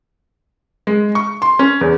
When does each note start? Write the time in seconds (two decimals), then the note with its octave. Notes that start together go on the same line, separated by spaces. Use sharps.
0.87 G#3
1.15 C#6
1.42 C6
1.59 C#4
1.81 E2